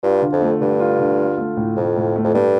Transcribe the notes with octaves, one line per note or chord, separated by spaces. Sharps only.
G2 F4
D3
F2
A3
G2 D3
F4
D3
F4
A3
A2
F2 A2
A2
A3
F2
G2 A3